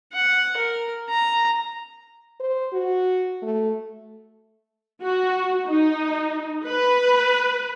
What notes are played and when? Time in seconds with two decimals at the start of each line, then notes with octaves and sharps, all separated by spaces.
0.13 F#5
0.57 A#4
1.09 A#5
2.40 C5
2.73 F#4
3.42 A3
5.03 F#4
5.67 D#4
6.65 B4